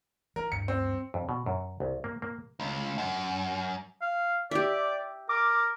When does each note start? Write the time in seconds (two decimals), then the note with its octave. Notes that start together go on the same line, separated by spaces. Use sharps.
0.36 E3 A#4
0.52 D2 G2 G3 C#7
0.68 C4
1.14 F2
1.29 B2
1.46 F#2
1.80 C2
2.04 A#3
2.22 A#3
2.60 C#2
2.98 F#2
4.02 F5
4.51 G4 D5 E5
5.29 A#4 D6